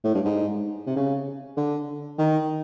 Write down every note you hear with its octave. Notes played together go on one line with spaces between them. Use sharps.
A2
G2
G#2
C3
C#3
D3
D#3